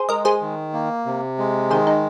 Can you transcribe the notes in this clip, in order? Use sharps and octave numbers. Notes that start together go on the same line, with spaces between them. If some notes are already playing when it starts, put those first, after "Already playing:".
Already playing: G#4 C5
G#3 A#4 D#5
G#4 C5
D#3
A#3
C3
G#3
D#3 G#4 C5
D#4